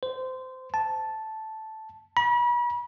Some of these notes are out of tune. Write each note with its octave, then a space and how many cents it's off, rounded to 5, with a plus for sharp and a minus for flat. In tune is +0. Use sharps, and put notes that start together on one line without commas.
C5 -20
A5 -5
B5 -40